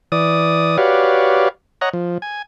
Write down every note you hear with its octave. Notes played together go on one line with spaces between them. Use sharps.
E3 D5 D#6
F#4 G4 B4 C#5 D5 F5
C#5 D#5 F#5 A#5
F3
G#5